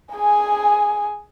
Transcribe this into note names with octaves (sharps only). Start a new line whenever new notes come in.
G#4 G#5